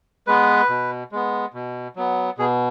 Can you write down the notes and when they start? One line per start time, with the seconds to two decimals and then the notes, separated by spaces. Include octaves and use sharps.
0.27 G#3 B3 B4
0.69 B2
1.12 G#3 B3
1.54 B2
1.96 F#3 B3
2.38 B2 G#4